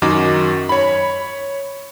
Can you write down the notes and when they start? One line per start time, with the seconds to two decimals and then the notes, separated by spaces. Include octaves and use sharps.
0.02 F#2 D#3 F#4 D#5 D6
0.69 C#5 B5